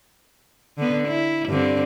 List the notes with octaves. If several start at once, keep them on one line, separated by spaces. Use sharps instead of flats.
D3 B3
E4
G2 D3 C4